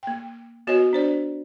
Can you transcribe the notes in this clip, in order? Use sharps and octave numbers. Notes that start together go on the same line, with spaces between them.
A#3 G5
B3 F#4 B4 C#5 D#5 G#5
D4 C5 D5